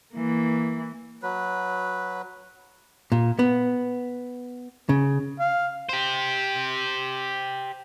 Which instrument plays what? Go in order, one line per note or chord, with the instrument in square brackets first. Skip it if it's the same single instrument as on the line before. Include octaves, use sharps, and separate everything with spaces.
[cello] E3 A#3
[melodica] F#3 B4
[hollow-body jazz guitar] A#2
B3
C#3
[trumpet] F5
[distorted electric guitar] G4 C5